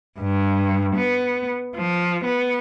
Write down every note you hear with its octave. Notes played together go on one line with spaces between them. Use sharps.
G2
B3
F3
B3